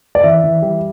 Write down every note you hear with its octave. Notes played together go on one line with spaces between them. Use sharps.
D5
E3 E5
E3
G3